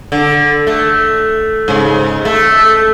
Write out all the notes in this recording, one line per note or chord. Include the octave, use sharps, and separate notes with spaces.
D3
A3
G#2 C#3
A3